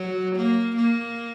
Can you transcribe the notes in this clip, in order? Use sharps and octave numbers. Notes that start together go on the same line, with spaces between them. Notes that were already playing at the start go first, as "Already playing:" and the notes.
Already playing: F#3
A#3
A#3